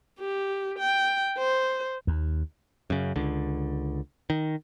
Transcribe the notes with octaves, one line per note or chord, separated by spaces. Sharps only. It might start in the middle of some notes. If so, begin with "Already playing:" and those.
G4
G5
C5
D#2
F#2 C#3
C#2 D3
D#3